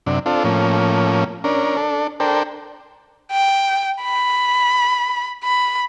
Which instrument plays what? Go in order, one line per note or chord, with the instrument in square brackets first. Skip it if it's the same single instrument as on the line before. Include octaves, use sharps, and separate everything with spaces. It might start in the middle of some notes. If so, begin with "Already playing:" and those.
[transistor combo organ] F#2 C3 D4
C4 D4 F4 A4
A2 F3 A#3 C#4
C#4 D4 A#4
D4 A4
D4 A4 A#4 C5 G5
[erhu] G5
B5
B5